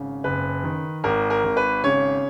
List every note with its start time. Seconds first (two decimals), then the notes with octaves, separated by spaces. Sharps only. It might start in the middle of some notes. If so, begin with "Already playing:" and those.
Already playing: G#1 C#3
0.24 F#1 B4
0.64 D#3
1.04 G#1 A#4
1.30 A#4
1.44 G#1
1.57 B4
1.84 C#3 C#5